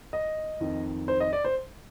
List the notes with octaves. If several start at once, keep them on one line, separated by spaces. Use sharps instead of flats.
D#5
F2 D#3
C5
D#5
D5
C5